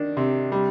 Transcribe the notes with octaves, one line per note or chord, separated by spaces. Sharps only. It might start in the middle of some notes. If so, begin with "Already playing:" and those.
Already playing: D#3 D4
C3
G3